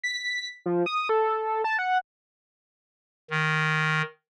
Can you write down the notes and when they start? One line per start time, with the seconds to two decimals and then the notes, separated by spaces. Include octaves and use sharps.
0.04 B6
0.66 F3
0.86 D#6
1.09 A4
1.64 A5
1.79 F#5
3.31 D#3